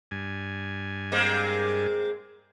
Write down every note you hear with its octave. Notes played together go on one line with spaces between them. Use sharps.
G2 G#5
G#3 A#3 C4